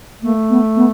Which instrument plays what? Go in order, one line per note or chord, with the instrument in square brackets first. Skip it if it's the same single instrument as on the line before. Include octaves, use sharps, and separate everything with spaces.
[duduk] A3 [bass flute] A#3
[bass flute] B3
B3